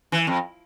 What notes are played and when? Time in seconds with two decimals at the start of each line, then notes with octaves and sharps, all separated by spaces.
0.12 E3
0.27 F2